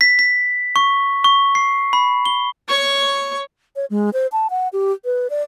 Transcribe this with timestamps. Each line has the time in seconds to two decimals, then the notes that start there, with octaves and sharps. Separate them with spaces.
0.01 B6
0.19 B6
0.76 C#6
1.24 C#6
1.55 C7
1.93 B5
2.26 G7
2.68 C#5 C#6
3.76 C#5
3.90 G#3
4.14 C5
4.32 A5
4.50 F#5
4.73 G4
5.05 B4
5.30 D5